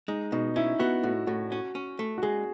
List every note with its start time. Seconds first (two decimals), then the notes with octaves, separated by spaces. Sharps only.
0.08 G#3 D#4
0.32 B2 D#4
0.56 C#4 E4
0.79 B3 F#4
1.03 A2 F#4
1.27 A2 F#4
1.51 C#4 F#4
1.75 C#4
1.99 A3
2.18 F#4
2.23 G#3 G#4